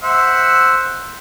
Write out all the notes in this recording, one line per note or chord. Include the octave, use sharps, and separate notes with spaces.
C5 E5 F#5